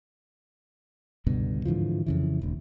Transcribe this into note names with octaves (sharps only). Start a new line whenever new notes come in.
C#2 G2 B2 D3
G#2 D3 E3 F3
F2 C#3 E3
E1 D2